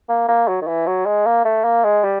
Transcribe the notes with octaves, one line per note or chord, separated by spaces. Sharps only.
A#3
A#3
F#3
D#3
E3
F#3
G#3
A#3
A3
A#3
G#3
G3